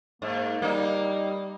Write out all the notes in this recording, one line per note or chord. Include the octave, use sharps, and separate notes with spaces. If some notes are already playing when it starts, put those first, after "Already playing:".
G#2 A#3
G3 A#3 D#4